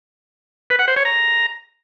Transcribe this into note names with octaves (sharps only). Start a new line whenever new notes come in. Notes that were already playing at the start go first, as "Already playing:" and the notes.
B4
F#5
C5
C#5
A#5